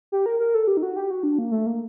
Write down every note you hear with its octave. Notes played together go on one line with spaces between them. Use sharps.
G4
A#4
A#4
A4
G4
D#4
F#4
G4
F#4
D4
A#3
A3
A#3